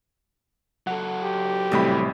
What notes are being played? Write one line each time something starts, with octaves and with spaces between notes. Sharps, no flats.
F#3 A4 F#5
G4
A1 A2 C3 G3 B5